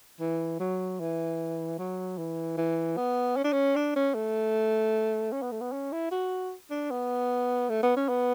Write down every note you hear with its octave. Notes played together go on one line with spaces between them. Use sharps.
E3
F#3
E3
F#3
E3
E3
B3
C#4
D4
C#4
D4
C#4
A3
C#4
B3
A3
B3
C#4
E4
F#4
D4
B3
A3
B3
C#4
B3